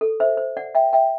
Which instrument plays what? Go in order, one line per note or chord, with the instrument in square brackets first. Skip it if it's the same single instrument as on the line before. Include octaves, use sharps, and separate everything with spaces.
[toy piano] A4
C5 E5
C5
D5 F#5
E5 G5
E5 G5